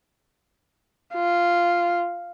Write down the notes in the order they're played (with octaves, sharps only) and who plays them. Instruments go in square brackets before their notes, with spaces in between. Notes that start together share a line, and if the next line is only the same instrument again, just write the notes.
[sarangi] F4